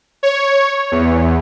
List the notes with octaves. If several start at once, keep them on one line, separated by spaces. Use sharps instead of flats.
C#5
E2